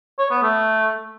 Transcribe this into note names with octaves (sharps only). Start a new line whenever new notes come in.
C#5
B3
A3